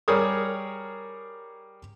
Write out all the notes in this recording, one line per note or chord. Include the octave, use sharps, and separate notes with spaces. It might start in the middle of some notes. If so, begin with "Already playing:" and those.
G3 G#4 A#4 C#5 D#6